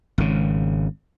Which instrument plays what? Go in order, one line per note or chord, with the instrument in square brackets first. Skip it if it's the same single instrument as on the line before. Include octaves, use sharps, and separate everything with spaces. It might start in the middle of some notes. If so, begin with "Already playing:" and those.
[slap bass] G#1 C#3